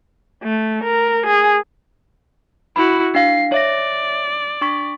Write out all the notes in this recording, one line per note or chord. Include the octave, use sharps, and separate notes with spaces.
A3
A#4
G#4
E4 F#4 B5
D4 F5 C7
C#5 D5 E5 A#6
D4 C#6 B6